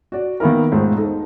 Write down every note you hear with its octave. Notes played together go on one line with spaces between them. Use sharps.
F#4 D5
D#3 A#3 B3 E4 A#4
E1 G#2 A3 F4 C5
D#4 A4